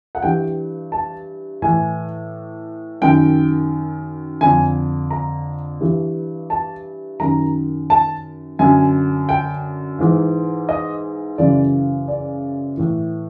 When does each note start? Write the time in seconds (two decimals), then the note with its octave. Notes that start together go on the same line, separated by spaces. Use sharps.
0.15 F#5
0.22 G2 E3 G5
0.92 A5
1.62 A2 E3 G#5
3.02 F#2 D#3 G5
4.41 F2 D3 G#5
5.11 A#5
5.80 G2 E3
6.50 A5
7.20 F#2 D#3 A#5
7.90 A5
8.59 F#2 D3 G#5
9.29 G5
9.99 G#2 E3
10.69 D#5
11.38 F#2 C#3 E3 D5
12.08 D5
12.77 A2 E3